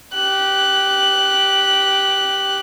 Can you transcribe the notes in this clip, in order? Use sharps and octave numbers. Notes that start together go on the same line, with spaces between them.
G4 F#6